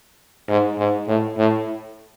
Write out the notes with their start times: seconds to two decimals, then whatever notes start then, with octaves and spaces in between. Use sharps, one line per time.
0.49 G#2
0.79 G#2
1.08 A2
1.38 A2